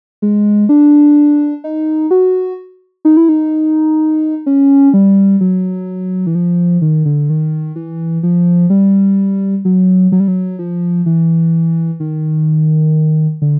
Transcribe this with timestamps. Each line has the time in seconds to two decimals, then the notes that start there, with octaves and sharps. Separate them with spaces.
0.22 G#3
0.69 D4
1.64 D#4
2.11 F#4
3.05 D#4
3.17 E4
3.29 D#4
4.46 C#4
4.94 G3
5.41 F#3
6.27 E3
6.35 F3
6.82 D#3
7.05 D3
7.30 D#3
7.76 E3
8.23 F3
8.70 G3
9.65 F#3
10.12 F#3
10.20 G3
10.28 F#3
10.59 F3
11.06 E3
12.00 D#3
13.42 D3